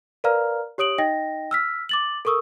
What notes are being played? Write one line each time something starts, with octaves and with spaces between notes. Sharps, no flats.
A#4 B4 D5 F5 A#5 F6
G4 C#5 D#6 D7 F#7
D#4 D#5 G5 A#6
E6 F6 B6
D6 A6 F#7
A4 A#4 C#6 D#6 E6